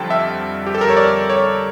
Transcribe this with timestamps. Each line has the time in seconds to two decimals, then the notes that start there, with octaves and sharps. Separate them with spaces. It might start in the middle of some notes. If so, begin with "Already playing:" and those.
Already playing: F2 D3 G3 G5 A5
0.10 E5
0.67 G4
0.75 A4
0.81 A#4
0.89 C#5
0.97 D5
1.30 C#5